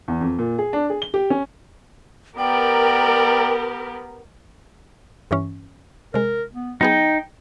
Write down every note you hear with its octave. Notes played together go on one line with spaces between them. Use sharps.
E2
F2
A#2
G#4
D4
G#4
G7
G4
C#4
B3 G4 A#4 D5 G5
G2 E3 C#4
C3 G#3 A#4
B3
F#3 B3 D#4 G#4 G5